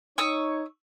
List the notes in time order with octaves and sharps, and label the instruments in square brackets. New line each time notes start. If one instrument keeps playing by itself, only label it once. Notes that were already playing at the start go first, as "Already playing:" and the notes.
[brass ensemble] D#4 C#5 [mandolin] C#6 D#6 E6